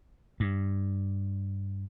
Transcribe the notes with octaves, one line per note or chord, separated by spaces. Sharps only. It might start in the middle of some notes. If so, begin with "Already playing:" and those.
G2